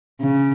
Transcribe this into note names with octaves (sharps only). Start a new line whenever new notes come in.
C#3